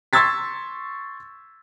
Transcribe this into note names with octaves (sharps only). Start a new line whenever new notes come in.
C6 C#6 E6 G#6 A6 B6